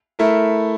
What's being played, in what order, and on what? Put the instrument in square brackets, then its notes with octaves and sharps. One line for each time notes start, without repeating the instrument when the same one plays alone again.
[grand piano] A3 E4 A#4